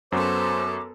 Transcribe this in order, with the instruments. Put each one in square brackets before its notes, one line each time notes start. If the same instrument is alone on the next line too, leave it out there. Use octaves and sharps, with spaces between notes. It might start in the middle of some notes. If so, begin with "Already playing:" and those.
[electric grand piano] F#2 F#4 [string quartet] B3 A4 [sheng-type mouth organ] C5 [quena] D6